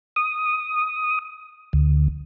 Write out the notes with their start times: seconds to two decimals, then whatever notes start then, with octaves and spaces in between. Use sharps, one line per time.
0.16 D#6
1.73 D2